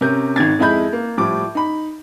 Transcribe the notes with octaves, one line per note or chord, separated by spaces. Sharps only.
C3 C#4 A#4 G6
G#1 D#3 G#6 A6
F2 G#3 E4 D#5 B5 G6
A#3
A2 F3 G3 D6
D#4 B5